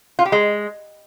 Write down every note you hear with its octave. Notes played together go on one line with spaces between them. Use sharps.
F4
G4
G#3